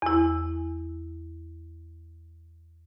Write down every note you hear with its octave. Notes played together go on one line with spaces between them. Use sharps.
E2 E4